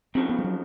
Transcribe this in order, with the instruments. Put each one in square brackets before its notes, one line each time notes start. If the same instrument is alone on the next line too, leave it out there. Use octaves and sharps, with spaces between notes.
[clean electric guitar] F2 C#3 F3 [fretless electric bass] C4
[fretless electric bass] B3
G3
F#3